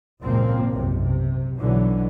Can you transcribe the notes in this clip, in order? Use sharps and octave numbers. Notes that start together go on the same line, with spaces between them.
G#1 C#2 A#2 F3 A#3 C4
F#1 B1 C3
C3
B1 B2 D3 E3 F#3